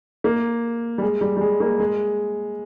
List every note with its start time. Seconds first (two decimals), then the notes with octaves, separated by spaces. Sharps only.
0.24 A#3
0.98 G3
1.02 G#3
1.21 G3
1.37 G3
1.41 G#3
1.60 A#3
1.80 G#3